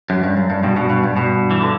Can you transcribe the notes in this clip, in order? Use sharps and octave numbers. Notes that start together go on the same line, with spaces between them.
F#2
G2
F#2
G2
G2 B2
G2 B2
G2 B2
G2
G2 B2
E3
D3